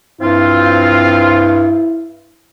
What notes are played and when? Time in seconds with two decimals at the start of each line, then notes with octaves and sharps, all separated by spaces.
0.21 G2 F3 C4 E4 F4